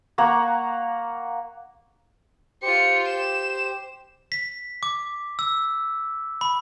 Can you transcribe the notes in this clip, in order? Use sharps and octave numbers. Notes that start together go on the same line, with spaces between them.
A#3 F#5 A#5 C#6
F4 G4 C5 C#7
E7
B6
D6
E6
B5